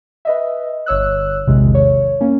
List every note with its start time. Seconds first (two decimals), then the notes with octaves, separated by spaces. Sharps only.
0.25 B4 D#5 E5
0.86 G1 C#5 E6 F#6
1.47 A#1 E2 C3 D#3 G#3
1.75 C#5
2.21 A#3 C#4